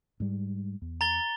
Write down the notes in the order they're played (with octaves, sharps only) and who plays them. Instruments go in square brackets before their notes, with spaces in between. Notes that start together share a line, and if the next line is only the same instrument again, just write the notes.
[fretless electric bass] G#2 G3
E2
[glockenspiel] A#5 A6 G7